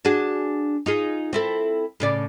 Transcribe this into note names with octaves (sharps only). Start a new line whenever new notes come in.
D4 F#4 G#4
D#4 F4 G#4
C4 E4 A4
A2 C#3 D5